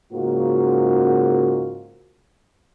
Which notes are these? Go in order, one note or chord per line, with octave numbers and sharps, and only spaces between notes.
G#2 C#3 A#3 F4 F#4